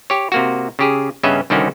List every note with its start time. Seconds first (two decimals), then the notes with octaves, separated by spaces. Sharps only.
0.10 G4 C#5
0.32 C3 A#3 F#4
0.79 C#3 G4 G#4
1.23 G2 C#3 B3 C#4 D#5 E5
1.50 C2 D3 D#3 C4 C#4 F#4